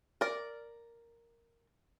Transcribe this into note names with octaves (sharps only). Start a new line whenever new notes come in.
A#4 D5